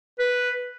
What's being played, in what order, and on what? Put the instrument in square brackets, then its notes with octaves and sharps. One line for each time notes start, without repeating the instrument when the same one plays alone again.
[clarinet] B4